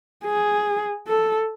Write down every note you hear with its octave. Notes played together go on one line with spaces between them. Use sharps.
G#4
A4